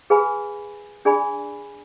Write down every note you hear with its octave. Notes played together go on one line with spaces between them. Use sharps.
G#4 B4 F5 G#5 B5
D4 G#4 D5 G#5 B5